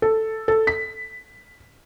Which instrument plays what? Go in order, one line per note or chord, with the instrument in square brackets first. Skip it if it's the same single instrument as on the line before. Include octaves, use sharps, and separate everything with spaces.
[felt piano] A4
A4
B6